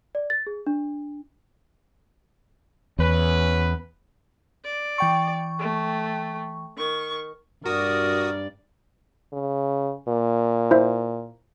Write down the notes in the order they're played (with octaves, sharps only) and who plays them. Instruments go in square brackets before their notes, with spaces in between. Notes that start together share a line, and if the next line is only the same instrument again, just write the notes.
[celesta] D5
A6
G#4
D4
[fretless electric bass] E2 [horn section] C#4 B4
[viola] D5
[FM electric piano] E3 G5 C#6
[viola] A3
D#3 C#6
[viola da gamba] G2 D5 [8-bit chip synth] F#4 D#6 [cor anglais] A#4
[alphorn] C#3
A#2
[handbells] E4 C5 E5